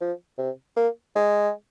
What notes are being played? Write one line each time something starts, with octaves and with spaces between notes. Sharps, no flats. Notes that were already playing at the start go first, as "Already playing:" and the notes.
F3
C3
A#3
G#3